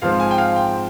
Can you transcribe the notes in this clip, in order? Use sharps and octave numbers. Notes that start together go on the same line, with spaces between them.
G#2 F3 C4 F5
G#5
G5
F5
G5